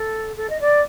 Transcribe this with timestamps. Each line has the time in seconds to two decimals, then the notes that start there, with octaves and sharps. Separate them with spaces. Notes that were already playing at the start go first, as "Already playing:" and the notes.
Already playing: A4
0.37 A4
0.49 D#5
0.60 D5